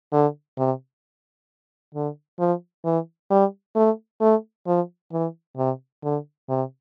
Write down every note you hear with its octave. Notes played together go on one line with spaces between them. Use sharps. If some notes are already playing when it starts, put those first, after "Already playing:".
D3
C3
D3
F3
E3
G3
A3
A3
F3
E3
C3
D3
C3